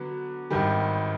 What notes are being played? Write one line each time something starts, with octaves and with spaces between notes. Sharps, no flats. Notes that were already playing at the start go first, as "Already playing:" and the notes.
Already playing: D3 F#3 B3
G#1 G2 D#3 G3